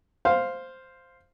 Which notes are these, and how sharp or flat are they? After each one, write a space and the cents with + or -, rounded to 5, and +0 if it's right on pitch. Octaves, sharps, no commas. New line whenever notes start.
C5 +0 F5 +0